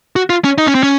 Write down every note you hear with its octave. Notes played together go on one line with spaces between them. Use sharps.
F#4
F4
C#4
D#4
C#4
C4
C#4